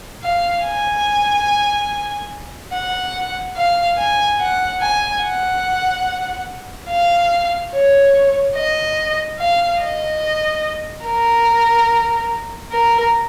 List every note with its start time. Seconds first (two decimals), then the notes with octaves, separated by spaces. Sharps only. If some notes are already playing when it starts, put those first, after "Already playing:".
0.23 F5
0.65 G#5
2.73 F#5
3.56 F5
3.98 G#5
4.40 F#5
4.81 G#5
5.22 F#5
6.89 F5
7.72 C#5
8.55 D#5
9.39 F5
9.80 D#5
11.06 A#4
12.72 A#4